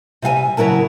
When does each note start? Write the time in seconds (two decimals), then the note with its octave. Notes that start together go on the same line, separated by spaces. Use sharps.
0.22 C3 G3 F5 G#5
0.57 C#3 F#3 E4 A#4 A5